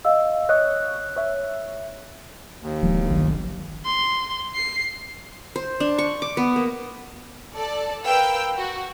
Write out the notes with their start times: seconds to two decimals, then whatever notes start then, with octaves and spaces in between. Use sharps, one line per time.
0.05 D#5 F5 E6
0.49 C#5 D#5 C#6 F#6
1.16 C#5 E5
2.61 D#2
2.83 D1 F3 G#3
3.09 G1 C2 D#3 F#3
3.85 C6
4.55 C7
5.56 C5
5.80 D4
5.98 C#6
6.22 D6
6.37 B3
6.56 A#3
7.54 A4 D5
8.03 A#4 B4 F5 G5 E6
8.56 F#4